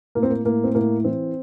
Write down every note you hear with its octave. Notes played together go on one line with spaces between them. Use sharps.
A2 A#3
C4
A#3
A2 A#3
C4
A2 A#3
E3 C4